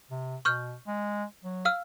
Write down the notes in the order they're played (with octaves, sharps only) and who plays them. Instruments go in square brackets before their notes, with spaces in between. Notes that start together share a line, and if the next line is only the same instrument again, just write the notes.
[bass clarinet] C3
[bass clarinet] B2 [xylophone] C#6 F6 G6
[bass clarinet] G#3
F#3
[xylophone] F5 E6 F6